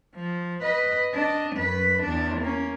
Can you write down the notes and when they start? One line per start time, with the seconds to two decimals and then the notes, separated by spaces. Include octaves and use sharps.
0.15 F3
0.63 B4 D#5
1.15 D4 D#5
1.56 F#2 B4
2.02 E2 D4
2.40 A#3 C#4